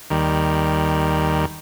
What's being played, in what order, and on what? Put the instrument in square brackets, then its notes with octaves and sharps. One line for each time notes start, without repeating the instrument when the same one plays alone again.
[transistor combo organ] D#2 D#3 G3